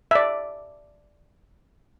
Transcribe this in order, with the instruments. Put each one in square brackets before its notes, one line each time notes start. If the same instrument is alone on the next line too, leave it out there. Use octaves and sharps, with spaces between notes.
[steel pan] D5 E5